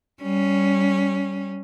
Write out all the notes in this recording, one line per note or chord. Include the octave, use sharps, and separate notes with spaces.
G3 C#4